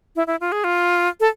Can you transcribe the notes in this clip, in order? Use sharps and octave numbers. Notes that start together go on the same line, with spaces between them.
E4
E4
F4
G#4
F4
A4